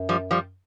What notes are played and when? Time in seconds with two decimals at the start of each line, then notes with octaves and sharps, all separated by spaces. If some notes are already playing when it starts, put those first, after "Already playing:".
Already playing: F#2
0.09 F3 G3
0.31 F3 G3